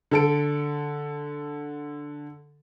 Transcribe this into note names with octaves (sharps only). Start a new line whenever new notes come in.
D3 A4 D7